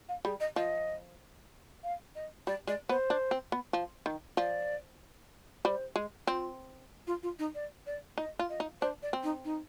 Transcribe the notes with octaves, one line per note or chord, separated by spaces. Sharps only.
F5
G3 G#4
D#5
F3 D#5
F5
D#5
G3 D5
G#3 D5
B3 C5
D4
C4
B3
F3
D#3
F3 D5
G3 C5
G#3
C4 F4
F4
F4
D#4
D5
D5
D#4 D#5
F4
D#5
D#4
D4 C5
D5
C4
D#4
D#4